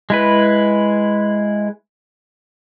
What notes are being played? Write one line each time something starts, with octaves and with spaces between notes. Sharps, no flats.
G#3 E4 B4